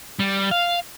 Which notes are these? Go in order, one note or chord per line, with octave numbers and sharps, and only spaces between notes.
G3
F5